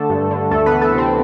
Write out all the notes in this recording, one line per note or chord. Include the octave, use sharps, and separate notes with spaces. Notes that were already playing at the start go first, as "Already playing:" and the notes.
Already playing: D3 A3 A4
G2
D3
D2 A3 A4
B3 B4
E3
A3 A4
C3
C4